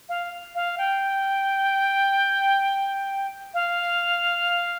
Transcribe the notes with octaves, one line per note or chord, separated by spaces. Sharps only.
F5
F5
G5
F5